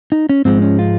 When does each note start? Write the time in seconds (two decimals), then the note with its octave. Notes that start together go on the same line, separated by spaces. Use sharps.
0.12 D#4
0.29 C#4
0.45 G#2 F3 G#3 C4
0.62 C#4
0.79 F4